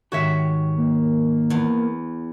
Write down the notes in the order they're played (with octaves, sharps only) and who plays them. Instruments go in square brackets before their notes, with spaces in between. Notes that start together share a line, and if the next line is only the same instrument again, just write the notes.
[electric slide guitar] G#2 D#3 G4 [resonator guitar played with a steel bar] F#4 C#5 E5
[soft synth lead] A#3
[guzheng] E2